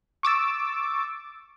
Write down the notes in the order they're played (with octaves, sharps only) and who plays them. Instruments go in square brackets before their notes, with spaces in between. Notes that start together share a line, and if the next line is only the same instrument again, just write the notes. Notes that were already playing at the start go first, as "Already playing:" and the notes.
[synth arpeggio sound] C#6 D6 E6 A6